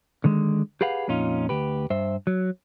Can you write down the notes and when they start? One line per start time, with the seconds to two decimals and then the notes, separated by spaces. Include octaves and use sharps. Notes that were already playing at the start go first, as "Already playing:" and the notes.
0.24 D3 D#3 G#3
0.81 G4 G#4 B4 F5 F#5
1.08 F2 A#2 C#4 D#4 F4
1.49 D2 G4 B4
1.90 G2 C5 E5
2.27 F#3